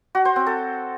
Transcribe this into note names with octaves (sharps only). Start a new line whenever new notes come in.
F#4
C5
C4
A4